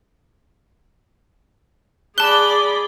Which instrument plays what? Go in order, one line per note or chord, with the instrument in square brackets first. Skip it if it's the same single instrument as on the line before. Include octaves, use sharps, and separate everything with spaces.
[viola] G#4 B5 [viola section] D5 [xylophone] A5 F#6 [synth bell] G7